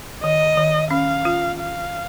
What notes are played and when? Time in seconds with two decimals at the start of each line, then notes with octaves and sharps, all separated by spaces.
0.23 D#3 D#5
0.57 D#3
0.91 C#4 F5
1.25 F4
1.59 F5